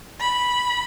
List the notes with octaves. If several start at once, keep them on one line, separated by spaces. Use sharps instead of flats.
B5